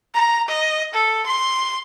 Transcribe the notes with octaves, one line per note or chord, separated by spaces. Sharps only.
A#5
D#5
A4
C6